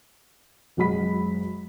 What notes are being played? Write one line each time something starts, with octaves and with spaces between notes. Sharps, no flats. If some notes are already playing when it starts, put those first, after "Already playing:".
F#1 F#3 G#3 B5 B6